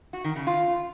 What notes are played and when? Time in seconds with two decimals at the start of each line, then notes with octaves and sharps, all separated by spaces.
0.13 F#4
0.24 D#3
0.36 C#3
0.47 F4